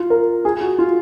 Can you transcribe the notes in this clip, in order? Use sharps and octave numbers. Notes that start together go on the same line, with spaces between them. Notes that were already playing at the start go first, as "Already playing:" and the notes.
Already playing: F4
A#4
G#4
F#4
F4